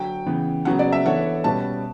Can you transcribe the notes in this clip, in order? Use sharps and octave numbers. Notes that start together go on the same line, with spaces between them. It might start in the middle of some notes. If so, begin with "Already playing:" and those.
Already playing: D3 F#3 F#4 G5
C#3 E3 B3
C#3 F#3 B3 F#4 F#5
D5
E5
E3 B3 D4 A4 C#5 F#5
B2 G3 C#4 G4 B4 A5